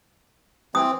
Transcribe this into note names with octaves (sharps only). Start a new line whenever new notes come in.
E3 C4 D#6